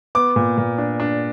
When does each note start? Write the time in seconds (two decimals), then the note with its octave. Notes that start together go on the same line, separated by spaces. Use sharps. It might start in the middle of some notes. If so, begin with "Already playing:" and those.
0.15 B3 D6
0.36 A#2
0.58 A#2
0.78 D4
1.00 D4